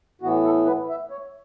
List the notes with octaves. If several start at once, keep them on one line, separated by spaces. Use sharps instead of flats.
A2 E3 B3 F#4
A4
B4
E5
C#5